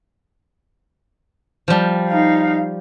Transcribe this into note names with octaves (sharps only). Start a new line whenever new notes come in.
F3 G3
D#4 F5